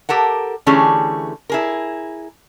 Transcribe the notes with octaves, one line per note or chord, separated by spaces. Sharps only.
G4 A4 A#4 F#5
D3 E3 A3 C#4 G4 G#4
E4 G#4 A#4